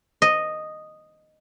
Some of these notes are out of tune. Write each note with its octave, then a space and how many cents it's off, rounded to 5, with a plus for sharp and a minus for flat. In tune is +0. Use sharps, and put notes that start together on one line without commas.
D#5 -5